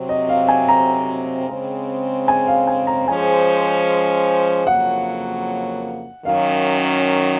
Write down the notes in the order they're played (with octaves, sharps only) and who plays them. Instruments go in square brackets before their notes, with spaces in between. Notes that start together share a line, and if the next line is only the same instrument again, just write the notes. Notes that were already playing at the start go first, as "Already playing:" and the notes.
Already playing: [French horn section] C3 F#3 C4
[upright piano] D#5
F5
G#5
A#5
[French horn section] C#3 G#3 C4
[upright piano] G#5
F5
G#5
A#5
[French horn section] F3 G#3 C#4 G#4 C5 [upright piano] G#5
[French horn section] F2 C#3 F#3 A#3 F4 [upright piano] F#5
[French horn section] F#2 D#3 F#3 C#4 [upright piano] F5